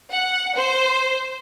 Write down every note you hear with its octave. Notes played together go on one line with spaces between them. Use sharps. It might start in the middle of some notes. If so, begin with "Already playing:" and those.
F#5
C5